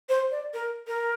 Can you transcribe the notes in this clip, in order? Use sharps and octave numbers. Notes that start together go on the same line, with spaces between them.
C5
D5
A#4
A#4